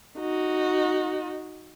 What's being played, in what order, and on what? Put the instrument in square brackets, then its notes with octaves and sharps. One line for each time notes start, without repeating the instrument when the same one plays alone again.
[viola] D#4 F#4